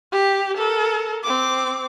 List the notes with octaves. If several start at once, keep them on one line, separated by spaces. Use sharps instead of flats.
G4
A4 A#4
C4 D6